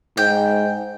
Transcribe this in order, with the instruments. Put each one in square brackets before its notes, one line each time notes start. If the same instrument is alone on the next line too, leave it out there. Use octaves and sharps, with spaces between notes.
[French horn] G#2 [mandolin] G5